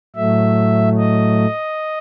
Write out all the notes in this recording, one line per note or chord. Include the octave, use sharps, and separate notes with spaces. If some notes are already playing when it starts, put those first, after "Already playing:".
A2 F#3 A3 E5
D#5